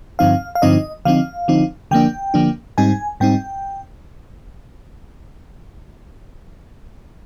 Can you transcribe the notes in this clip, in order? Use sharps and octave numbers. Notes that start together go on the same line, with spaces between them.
G2 D3 F3 C4 D#4 F5
F5
G2 D3 F3 C4 D#4 D#5
D3 F3 C4 D#4 F5
D3 F3 C4 D#4
D3 F3 A#3 D4 G5
D3 F3 A#3 D4
G#2 G3 C4 D#4 G#5
G#2 G3 C4 D#4 G5